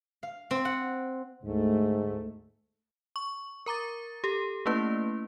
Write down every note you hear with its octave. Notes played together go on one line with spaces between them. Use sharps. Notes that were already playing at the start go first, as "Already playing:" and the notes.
F5
C4
F#5
D2 G#2 A3
C#6
A#4 A#5 D6 A6
G4 A4
A3 A#3 C#4 E4 B4